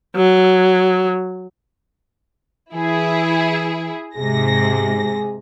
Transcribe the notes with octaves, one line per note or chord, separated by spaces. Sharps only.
F#3
E3 E4 G#4
G#2 C3 G#4 A#6